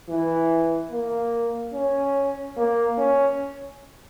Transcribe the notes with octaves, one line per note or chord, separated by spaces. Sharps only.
E3
A#3
C#4
A#3
C#4